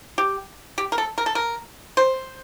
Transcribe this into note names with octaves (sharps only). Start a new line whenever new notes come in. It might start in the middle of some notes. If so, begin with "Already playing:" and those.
G4
G4
A#4
A4
A#4
A4
A#4
C5